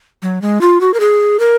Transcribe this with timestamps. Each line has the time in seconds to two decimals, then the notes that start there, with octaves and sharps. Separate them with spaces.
0.22 F#3
0.42 G#3
0.61 F4
0.81 F#4
0.94 A#4
1.00 G#4
1.39 A#4